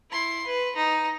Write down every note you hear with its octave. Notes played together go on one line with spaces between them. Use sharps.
E4 C6
B4
D#4